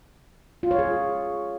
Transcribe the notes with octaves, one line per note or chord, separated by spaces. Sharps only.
F4
C#5
G#4